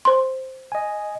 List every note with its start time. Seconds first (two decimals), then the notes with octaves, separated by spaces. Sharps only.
0.05 C5 C6
0.72 D#5 G#5